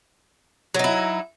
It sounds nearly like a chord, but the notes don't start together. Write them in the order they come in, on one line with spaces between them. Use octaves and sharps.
F#3 D#4 E4